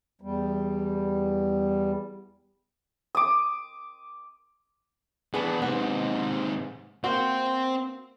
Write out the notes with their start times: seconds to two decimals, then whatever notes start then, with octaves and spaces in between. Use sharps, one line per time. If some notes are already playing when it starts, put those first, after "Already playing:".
0.21 E2 G3
3.15 D6 D#6
5.34 E3 B3 D4 G#4
5.62 G#2 C3 B3
7.04 A#3 C4 F#4